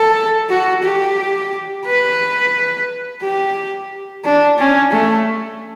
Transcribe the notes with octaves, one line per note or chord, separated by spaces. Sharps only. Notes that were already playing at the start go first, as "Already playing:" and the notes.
Already playing: A4
F#4
G4
B4
G4
D4
C#4
A3